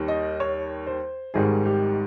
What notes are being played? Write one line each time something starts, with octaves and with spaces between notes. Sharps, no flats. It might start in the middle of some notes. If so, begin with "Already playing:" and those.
Already playing: D#2 D#3 G3
D#5
C#5
C5
G#1 G#2 D#3 G3 G#4
G4